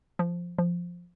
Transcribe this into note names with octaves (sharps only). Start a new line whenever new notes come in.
F3
F3